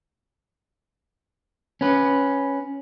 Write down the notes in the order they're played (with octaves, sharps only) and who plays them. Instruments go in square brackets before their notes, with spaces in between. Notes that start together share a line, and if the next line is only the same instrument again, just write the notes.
[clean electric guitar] C#4 B4